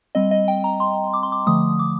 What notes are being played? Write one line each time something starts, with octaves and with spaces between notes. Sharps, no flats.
G3 C4 D#5
D#5
G5
A#5
C6
D6
C6
D6
D3 F3 A3 D#6
D6